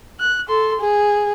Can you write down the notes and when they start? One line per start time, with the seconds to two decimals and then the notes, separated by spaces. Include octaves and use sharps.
0.20 F#6
0.49 A4 C6
0.80 G#4